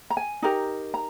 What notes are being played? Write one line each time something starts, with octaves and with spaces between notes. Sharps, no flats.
A#5
G#5
D#4 G4 A#4
A#5